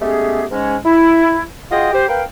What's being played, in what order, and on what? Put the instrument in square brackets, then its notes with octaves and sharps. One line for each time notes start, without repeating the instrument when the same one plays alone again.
[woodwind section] G#3 A3 B3 C#4 G4 G#4
G#2 G#3 C#4
E4
F4 F#4 G#4 D#5 G5 C6
G4 C5
A#4 B4 F5 G5